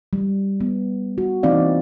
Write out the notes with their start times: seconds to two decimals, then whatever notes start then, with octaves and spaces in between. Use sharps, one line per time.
0.13 G3
0.61 B3
1.18 F#4
1.43 E3 A#3 C4 D#4 D5 F5